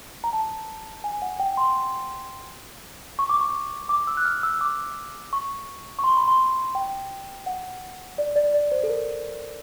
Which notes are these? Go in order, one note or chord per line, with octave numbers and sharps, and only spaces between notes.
A#5
A5
G#5
F#5
G5
C6
C#6
D6
C#6
D6
E6
F#6
F6
E6
D6
C#6
C#6
C6
B5
C6
G5
F#5
D5
D5
D5
C5
A4
A#4